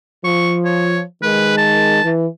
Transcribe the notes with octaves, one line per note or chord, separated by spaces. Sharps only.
F3 C#6
C#5
D#3 G#3 B4
A5
E3